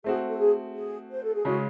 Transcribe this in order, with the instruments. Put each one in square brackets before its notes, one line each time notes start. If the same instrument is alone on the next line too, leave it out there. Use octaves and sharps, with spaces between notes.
[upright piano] A3 C4 F#4 [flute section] G#4
[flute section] A4
G#4
G#4
C5
A4
G#4
[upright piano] C#3 G#3 C#4 [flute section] F#4